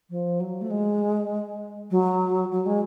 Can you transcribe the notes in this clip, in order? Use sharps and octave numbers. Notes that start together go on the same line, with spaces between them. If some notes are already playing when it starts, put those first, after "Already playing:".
F3
F#3
A3
G#3
F#3
F#3
G#3